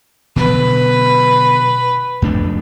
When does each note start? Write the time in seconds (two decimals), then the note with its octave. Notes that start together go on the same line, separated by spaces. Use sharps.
0.36 B2 D3 F#3 B4
2.22 F2 A3 D4